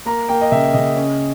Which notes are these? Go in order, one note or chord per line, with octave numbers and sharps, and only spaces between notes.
A#3 A#5
A#3 G5
D#5
C#3 E5
C#3 D#5
C#4